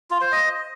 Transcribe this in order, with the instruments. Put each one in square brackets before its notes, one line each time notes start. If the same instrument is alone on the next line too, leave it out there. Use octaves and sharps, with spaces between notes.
[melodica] F4
C5
D#5